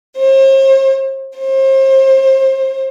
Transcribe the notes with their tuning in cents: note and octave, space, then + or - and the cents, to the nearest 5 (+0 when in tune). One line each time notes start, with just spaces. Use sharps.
C5 +45
C5 +35